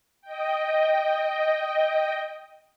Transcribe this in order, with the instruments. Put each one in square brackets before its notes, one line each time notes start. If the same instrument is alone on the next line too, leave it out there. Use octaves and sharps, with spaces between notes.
[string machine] D#5 G5